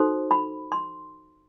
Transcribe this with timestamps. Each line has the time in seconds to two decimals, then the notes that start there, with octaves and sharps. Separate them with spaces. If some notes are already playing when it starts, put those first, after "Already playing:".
Already playing: D#4 F#4 A4 C5 C6
0.31 B5
0.72 C6